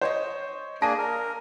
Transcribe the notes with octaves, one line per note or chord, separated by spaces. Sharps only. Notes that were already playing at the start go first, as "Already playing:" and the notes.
C5 C#5 D#5
A#3 D4 G#4 A5 A#6 D#7
A#4